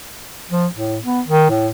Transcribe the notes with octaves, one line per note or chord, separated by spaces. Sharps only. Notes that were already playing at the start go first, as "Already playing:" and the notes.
F3
A2
B3
D#3
A2